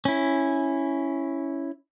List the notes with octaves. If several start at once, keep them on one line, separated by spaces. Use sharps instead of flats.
C#4 E4